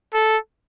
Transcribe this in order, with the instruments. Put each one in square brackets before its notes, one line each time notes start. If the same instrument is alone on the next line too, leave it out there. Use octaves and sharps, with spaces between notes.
[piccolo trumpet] A4